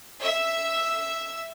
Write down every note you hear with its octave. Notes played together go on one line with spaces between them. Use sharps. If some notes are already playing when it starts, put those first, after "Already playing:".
E5